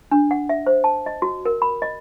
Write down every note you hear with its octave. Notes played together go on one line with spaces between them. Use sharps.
D4
F#5
E5
C5
A5
D#5
F#4
A#4
B5
D#5